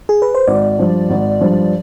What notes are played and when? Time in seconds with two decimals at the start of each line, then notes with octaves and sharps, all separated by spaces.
0.09 G#4
0.22 B4
0.35 C5
0.47 G#1 D5
0.79 G2 F3
1.10 G#1
1.41 G2 F3